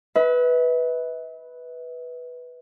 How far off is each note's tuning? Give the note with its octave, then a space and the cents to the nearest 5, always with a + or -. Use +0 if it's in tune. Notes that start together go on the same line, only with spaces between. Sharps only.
B4 +0 E5 -45